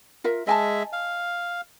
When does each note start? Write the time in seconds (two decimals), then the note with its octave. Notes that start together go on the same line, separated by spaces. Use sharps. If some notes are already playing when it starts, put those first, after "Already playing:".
0.24 F4 A#4 E5
0.47 G#3 D#5 E5 G#5 A5
0.93 F5